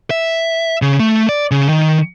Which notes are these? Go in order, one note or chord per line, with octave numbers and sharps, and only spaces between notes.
E5
C#3
A3
D5
C#3
D#3